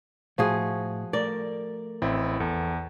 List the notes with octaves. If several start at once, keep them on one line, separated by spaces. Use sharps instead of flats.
A2 F3 F#4 G#4
A3 A#4 D5
A1 C4 E4
E2 A4